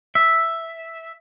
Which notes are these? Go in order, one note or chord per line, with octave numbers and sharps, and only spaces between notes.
E5